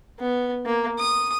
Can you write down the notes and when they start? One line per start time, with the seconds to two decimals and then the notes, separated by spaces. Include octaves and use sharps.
0.19 B3
0.66 A#3
0.99 D#6